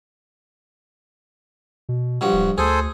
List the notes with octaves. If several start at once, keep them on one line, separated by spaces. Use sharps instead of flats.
B2
G2 F3 F#4
D1
D2 G#4 A4 C5 G#5